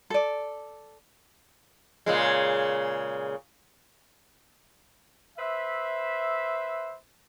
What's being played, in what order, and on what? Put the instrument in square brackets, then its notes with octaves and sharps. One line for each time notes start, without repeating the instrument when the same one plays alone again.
[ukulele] A4 D5
[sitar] A#2 C#3 G#3
[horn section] B4 C5 E5